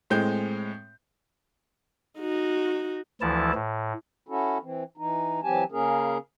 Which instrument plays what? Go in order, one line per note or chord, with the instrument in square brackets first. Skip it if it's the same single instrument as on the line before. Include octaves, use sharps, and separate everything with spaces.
[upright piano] A2 G#3 C4 G6
[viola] D#4 F#4
[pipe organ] D2 E3 F3 E4 A5
A2
[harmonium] C#4 E4 F#4 A4
E3 C4
E3 D#4
E3 F#3 C4 G4 G#5 A5
C#3 A#3 C#4 G#4 A#4